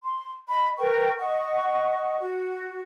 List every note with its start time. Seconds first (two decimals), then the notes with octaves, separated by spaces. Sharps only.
0.03 C6
0.48 D#5 B5
0.77 A#4 B4 G5 C#6
1.18 D#5 F#5 C#6
2.20 F#4